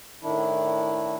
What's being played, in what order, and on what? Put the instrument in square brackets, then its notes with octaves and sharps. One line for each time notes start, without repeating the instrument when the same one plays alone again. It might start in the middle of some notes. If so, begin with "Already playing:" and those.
[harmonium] A2 D#3 D4 E4